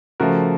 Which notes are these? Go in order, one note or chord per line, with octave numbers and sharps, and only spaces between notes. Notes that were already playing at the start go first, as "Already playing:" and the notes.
C#3 F3 A3 F#4 A#4